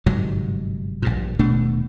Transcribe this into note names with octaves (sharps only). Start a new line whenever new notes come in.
G1 G#2 C3 F#3
A#1 G2 A#2
D#1 B2 A3 D4